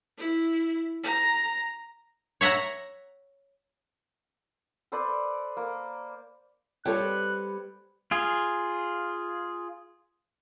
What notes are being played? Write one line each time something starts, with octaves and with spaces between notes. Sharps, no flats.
E4
A#5
C#5 E5 F#5 A#5
A4 B4 C5 D5
A#3
G3 C4 A4 B4 C#5 G5 F#6
F4 G#4